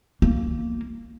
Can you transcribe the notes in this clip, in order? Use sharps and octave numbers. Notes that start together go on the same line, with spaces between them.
A#3